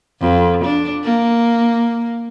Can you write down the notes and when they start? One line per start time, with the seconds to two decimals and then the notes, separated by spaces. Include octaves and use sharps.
0.21 F2
0.64 D4
1.04 A#3